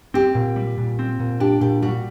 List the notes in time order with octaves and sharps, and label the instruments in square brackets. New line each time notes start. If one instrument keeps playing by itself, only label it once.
[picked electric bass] C4 [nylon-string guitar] G4
[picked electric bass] A#2
G3
A#2
C4
A#2
[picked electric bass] D4 [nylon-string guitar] G4
[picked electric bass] A#2 [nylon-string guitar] G4
[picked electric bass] G3 [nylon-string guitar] F#4